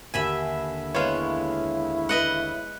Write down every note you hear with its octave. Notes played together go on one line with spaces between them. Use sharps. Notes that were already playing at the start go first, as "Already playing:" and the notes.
D#2 D3 E5 G#5 B5 E6
G#3 B3 E4 C#5 F5
B4 D#5 F#5